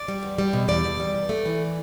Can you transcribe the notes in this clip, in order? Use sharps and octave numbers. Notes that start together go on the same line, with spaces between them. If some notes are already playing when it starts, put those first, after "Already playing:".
Already playing: D5
G3
E2
G3
B2
E2 D5
E2
G3
G2
A3
E3